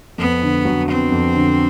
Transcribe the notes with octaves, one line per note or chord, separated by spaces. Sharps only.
F2 B3
D3
F#3
B3 C4
F2
D3